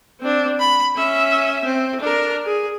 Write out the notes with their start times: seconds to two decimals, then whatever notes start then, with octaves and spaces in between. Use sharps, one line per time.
0.20 C4 D4
0.59 B5
0.96 C#4 E5
1.64 C4
2.00 D4 A#4
2.45 G#4